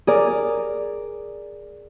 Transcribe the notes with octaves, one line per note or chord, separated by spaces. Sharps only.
G#4 A#4 D5